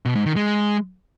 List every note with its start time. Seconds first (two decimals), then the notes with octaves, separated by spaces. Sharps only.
0.05 B2
0.16 G#2
0.26 D#3
0.36 G#3